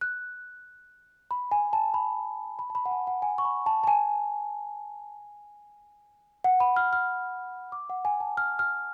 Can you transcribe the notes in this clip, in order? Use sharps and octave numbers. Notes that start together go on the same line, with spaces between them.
F#6
B5
G#5
A5
B5
B5
A5
B5
F#5
G#5
F#5
G#5
C#6
B5
A5
A5
G#5
F#5
B5
F6
F6
D6
F#5
G#5
A5
F6
F6